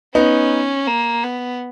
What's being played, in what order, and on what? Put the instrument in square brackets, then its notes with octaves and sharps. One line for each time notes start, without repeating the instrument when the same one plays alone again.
[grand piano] B3 D#4 [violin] C#4
[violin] A#3
B3